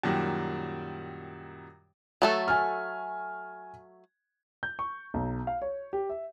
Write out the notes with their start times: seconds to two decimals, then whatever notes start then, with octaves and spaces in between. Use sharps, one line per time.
0.03 F#2 A#2 D#3 G3
2.22 F#3 A3 A4
2.48 G#5 F6
4.63 G6
4.79 C#6
5.14 B1
5.47 F5
5.62 C#5
5.93 G4
6.10 E5